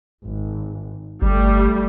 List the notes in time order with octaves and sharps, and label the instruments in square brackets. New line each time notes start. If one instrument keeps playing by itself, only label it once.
[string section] G#1
[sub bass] G1 [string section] G3 A3